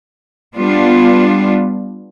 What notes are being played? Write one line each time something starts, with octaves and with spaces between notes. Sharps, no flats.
G3 B3 D4 F4